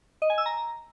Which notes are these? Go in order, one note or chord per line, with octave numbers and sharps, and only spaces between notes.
D#5
G#5
E6
A#5